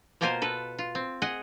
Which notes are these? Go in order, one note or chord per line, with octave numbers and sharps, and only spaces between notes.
B2 A#3 F4 A#4 C5 G#5
A4 B4
F4
C4
G#4 D#5 F#5 G#5